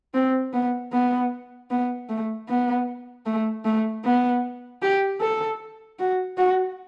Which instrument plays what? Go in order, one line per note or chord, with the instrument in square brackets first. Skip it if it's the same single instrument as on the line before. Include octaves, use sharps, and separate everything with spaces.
[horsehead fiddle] C4
B3
B3
B3
A3
B3
A3
A3
B3
G4
A4
F#4
F#4